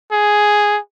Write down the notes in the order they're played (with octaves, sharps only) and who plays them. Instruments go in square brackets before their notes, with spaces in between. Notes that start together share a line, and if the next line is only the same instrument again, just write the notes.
[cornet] G#4